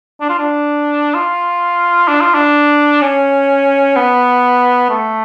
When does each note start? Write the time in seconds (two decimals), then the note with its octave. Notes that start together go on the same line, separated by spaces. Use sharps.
0.21 D4
0.29 F4
0.38 D4
1.15 F4
2.08 D4
2.21 F4
2.34 D4
3.02 C#4
3.96 B3
4.90 A3